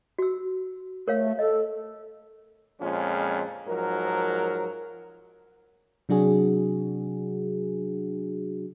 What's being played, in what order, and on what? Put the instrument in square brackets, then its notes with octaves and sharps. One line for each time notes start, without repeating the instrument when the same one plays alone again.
[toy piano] F#4 E6
[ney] A3 [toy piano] A#4 C#5 F5
[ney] A4 [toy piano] D#5
[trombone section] F2 A#2 F3 G#3 C#4
G#2 F3 F#3 A#4
[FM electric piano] C3 F#3 D4 F#4 G#4